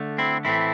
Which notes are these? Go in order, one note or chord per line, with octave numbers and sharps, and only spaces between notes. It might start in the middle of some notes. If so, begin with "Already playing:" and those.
Already playing: D3 A3
C4 E4
A2 E3 A3 C4 E4